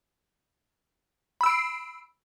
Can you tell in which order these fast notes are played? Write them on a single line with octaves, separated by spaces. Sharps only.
B5 E6 D7 C7